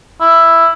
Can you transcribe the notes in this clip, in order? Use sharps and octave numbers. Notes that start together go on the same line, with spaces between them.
E4